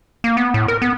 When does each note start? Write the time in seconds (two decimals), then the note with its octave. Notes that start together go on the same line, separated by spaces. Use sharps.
0.24 A#3
0.37 B3
0.54 A2
0.68 A#4
0.82 B3